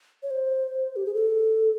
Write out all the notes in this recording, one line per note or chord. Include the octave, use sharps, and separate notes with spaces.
C#5
C5
G4
G#4
A4